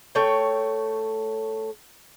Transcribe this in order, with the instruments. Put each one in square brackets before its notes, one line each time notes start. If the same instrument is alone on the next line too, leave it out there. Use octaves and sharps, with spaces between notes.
[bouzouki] A3 C#5 G5